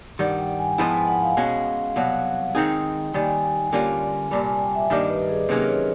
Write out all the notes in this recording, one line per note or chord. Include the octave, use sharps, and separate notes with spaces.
G2 D#3 G3 F#5
G5
G#5
G#2 F3 G#3 B3 E4 A5
G#5
F#5
F5
B2 G#3 C#4 F#4
C2 B2 F#3 F#5
D#3 G#3 C4 D#4 G#4 G5
D#2 D#3 G3 G#5
G#5
G#5
G#5
D3 G3 A#3 C#4 F4
C2 A#2 G3 A5
G#5
G5
E5
G2 D#3 G3 A#3 D4 D#5
B4
G#4
C3 D#3 F#3 A#3 C#4 G#4
C#5